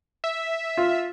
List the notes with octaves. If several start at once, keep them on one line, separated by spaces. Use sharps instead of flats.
E5
F4